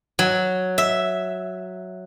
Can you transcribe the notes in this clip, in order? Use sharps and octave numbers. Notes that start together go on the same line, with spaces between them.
F#3
E5